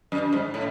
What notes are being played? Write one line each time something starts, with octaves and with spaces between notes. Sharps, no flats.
F#2
G#2
A2